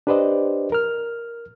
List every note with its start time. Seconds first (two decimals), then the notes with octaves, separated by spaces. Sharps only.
0.07 D4 G4 B4 C5 D5 D#5
0.72 A#4 F6